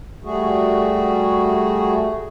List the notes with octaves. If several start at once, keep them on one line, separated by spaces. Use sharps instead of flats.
G3 A3 F#4 G#4